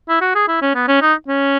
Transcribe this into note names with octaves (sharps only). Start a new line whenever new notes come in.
E4
F#4
G#4
E4
C#4
B3
C#4
D#4
C#4